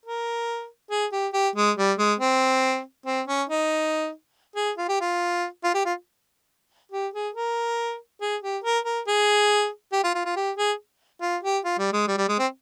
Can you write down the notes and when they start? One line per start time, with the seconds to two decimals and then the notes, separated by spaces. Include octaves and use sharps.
0.06 A#4
0.91 G#4
1.12 G4
1.33 G4
1.56 G#3
1.77 G3
1.98 G#3
2.20 C4
3.06 C4
3.28 C#4
3.49 D#4
4.56 G#4
4.78 F4
4.88 G4
5.01 F4
5.64 F4
5.74 G4
5.85 F4
6.92 G4
7.14 G#4
7.35 A#4
8.21 G#4
8.42 G4
8.64 A#4
8.85 A#4
9.07 G#4
9.92 G4
10.04 F4
10.15 F4
10.25 F4
10.36 G4
10.57 G#4
11.21 F4
11.43 G4
11.65 F4
11.79 G3
11.93 G#3
12.07 G3
12.17 G3
12.29 G#3
12.39 C4